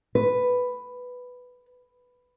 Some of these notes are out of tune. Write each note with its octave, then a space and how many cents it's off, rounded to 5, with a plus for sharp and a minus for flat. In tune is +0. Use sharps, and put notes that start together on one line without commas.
B4 +5